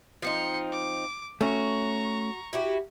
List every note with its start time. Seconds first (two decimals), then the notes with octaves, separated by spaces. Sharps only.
0.22 F3 C4 D#4 C6 C#7
0.72 D6
1.41 A3 C#4 F#4 A#5 C#6
2.53 E4 F#4 G4